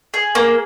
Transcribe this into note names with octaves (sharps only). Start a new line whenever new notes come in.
G#4
A#3